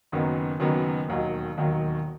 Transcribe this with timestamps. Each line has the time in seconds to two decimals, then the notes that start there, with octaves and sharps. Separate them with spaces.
0.12 F#1 F#2 D#3 F#3 B3
0.60 F#1 F#2 D#3 F#3 B3
1.08 E1 D#2 D#3 F#3
1.57 E1 D#2 D#3 F#3